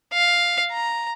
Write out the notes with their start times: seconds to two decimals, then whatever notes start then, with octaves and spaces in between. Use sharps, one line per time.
0.13 F5
0.71 A#5